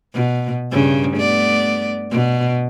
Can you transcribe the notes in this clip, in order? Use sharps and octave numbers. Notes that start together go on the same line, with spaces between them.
B2
G2 C#3
A3 B3 D5
B2